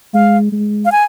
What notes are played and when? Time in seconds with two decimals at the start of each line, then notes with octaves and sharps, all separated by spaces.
0.14 G#3 F5
0.52 G#3
0.85 F5
0.92 G#5